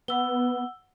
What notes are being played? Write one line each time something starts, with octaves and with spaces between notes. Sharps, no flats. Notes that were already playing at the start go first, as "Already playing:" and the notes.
B3 F#5 E6 G7